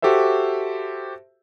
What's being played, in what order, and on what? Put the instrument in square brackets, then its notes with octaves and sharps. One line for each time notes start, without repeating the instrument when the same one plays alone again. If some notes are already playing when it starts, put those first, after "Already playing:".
[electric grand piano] F#4 G4 A4 C5 E5